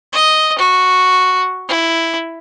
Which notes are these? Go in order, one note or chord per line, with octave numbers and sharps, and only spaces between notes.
D#5
F#4
E4